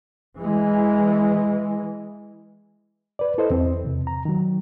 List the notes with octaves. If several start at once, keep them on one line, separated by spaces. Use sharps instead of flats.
E3 G#3
B4 D5
E4 A4 B4 C5 D#5
E2 C4
E2 C3
A#5
D#3 F#3